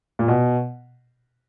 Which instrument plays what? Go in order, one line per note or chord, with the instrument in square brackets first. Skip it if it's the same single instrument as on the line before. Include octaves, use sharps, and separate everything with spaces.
[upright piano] A#2
B2